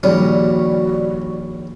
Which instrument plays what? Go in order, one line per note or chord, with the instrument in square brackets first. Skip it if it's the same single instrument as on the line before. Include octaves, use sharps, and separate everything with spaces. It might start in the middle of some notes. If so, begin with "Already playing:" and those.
[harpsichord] A#1 D#2 C#4 [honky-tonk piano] G3 [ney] F#4